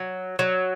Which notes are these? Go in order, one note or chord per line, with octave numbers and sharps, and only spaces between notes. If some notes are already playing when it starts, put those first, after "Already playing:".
Already playing: F#3
F#3